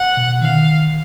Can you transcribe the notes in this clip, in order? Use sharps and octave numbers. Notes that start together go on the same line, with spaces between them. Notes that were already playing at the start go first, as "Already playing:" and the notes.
Already playing: F#5
B2
D#3 F5